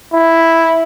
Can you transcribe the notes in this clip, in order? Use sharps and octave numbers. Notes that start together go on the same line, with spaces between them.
E4